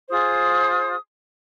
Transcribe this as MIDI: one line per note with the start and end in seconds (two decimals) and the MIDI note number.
0.09 0.95 65
0.09 0.95 68
0.09 0.95 72
0.09 0.95 87